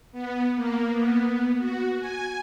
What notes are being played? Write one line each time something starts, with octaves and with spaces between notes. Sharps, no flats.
B3
A#3
B3
F#4
G#5